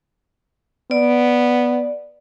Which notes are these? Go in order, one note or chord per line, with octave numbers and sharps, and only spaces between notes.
B3 D5